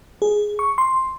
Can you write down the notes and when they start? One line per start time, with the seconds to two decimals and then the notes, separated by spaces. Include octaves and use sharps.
0.22 G#4
0.59 C#6
0.78 C6